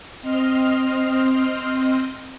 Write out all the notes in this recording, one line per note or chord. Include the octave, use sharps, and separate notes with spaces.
C4 D#5 C6 F6